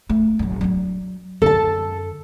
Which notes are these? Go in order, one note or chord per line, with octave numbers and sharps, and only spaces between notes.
A3
F#1 F#2
F#3 D4
F#2 D3 A4 A5